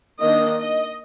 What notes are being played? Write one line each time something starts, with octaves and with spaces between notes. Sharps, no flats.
D#3 A#3 D4 D#5
D#5